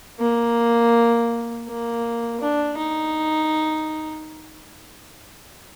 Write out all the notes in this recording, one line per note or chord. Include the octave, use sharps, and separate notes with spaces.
A#3
A#3
D4
D#4